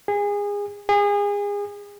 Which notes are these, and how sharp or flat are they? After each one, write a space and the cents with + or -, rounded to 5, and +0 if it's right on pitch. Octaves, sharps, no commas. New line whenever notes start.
G#4 -25
G#4 -30